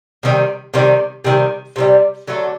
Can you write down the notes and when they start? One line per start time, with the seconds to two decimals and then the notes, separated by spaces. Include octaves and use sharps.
0.23 C3 D#3 G3
0.74 C3 D#3 G3
1.24 C3 D#3 G3
1.76 C3 D#3 G3
2.27 D3 F#3 A3